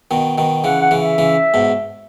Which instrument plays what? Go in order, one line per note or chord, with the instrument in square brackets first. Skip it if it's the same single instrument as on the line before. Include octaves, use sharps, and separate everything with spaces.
[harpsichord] B2 D#3
B2 D#3
[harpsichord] C#3 E3 [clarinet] F#5
[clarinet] F#5
[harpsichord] C#3 E3
[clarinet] E5
[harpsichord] C#3 E3
G#2 B2